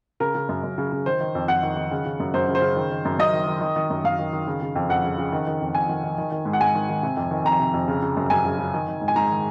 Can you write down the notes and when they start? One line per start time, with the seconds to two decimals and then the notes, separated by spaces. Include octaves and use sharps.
0.20 C#3 A#4
0.35 C#3
0.49 F#2
0.64 F#2
0.78 C#3
0.92 C#3
1.06 D#3 C5
1.21 D#3
1.35 F2
1.48 F2 F#5
1.63 D#3
1.76 D#3
1.91 C#3
2.06 C#3
2.20 F#2
2.34 F#2 C5
2.48 C#3
2.55 C5
2.62 C#3
2.76 D#3
2.91 D#3
3.05 F#2
3.19 F#2 D#5
3.33 D#3
3.47 D#3
3.61 D#3
3.76 D#3
3.90 F#2
4.04 F#2 F5
4.19 D#3
4.33 D#3
4.47 C#3
4.61 C#3
4.75 F2
4.89 F2 F#5
5.04 C#3
5.18 C#3
5.32 D#3
5.47 D#3
5.61 F2
5.74 F2 G#5
5.89 D#3
6.04 D#3
6.18 D#3
6.32 D#3
6.45 G#2
6.53 F#5
6.61 G#2 G#5
6.75 D#3
6.89 D#3
7.03 C3
7.17 F2
7.31 D#3
7.45 F2 A#5
7.59 C3
7.73 F2
7.88 C#3
8.02 C#3
8.17 F#2
8.30 F#2 G#5
8.45 C#3
8.59 C#3
8.74 D#3
8.88 D#3
9.01 G#2
9.08 G#5
9.16 G#2 A#5
9.31 D#3